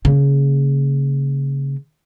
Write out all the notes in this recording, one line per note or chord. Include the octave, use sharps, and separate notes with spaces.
C#3 A#3